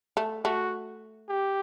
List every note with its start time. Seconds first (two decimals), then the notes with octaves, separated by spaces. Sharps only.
0.17 A3
0.45 A3 F#4
1.29 G4